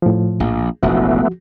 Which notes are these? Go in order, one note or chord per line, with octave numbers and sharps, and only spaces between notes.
A2 F3
A#1
E1 A1 F3 A3 B3 F#4